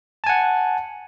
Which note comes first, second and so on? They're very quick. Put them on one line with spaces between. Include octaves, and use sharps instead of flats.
A5 G#5 F#5